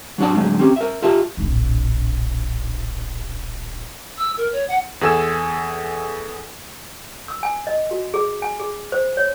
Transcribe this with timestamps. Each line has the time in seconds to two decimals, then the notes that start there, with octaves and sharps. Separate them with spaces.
0.18 F#3 D4 F#4 D5 A5
0.34 D3 F#3 G#3 A3
0.59 C4 C#4 G4
0.76 A#4 E5
1.02 F4 G4 E5 A5
1.37 D1 A#1
4.18 E6
4.37 A#4
4.53 C#5
4.68 F#5
5.01 E2 G#4 A4 G#5 E6 E7
7.28 E6
7.43 G#5
7.67 D#5
7.91 F#4
8.14 G#4
8.42 G#5
8.60 G#4
8.92 C5
9.17 C#5